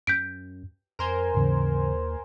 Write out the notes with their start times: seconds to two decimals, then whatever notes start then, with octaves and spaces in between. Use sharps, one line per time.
0.07 F#2 G6 B6 D7
0.99 F2 A#4 C5 G#5
1.34 D#2 G#2 C#3 E3